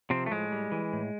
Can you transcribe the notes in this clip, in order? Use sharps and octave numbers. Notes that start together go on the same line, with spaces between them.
C3 F3 C4
A3
A2 G#3
G3
E3
A2